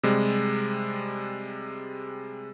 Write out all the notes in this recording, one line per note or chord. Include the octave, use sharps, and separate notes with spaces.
C3 G3 G#3